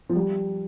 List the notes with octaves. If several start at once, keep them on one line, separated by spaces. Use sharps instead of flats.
F3
G3